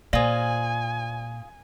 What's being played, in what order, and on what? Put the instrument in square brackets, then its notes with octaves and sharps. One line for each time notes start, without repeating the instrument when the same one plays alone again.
[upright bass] A#2 [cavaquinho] F4 G#4 [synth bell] C5 D5 [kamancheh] G#5